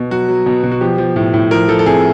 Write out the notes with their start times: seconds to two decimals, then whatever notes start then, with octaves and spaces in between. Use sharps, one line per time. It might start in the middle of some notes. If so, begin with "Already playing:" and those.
Already playing: B2
0.10 F#3 F#4
0.28 F#3
0.46 B2
0.63 B2
0.72 F#4
0.81 F3 G4
0.98 F3
1.16 A2
1.34 A2
1.51 F3 A#4
1.68 F3 A4
1.79 A4
1.86 C3 G#4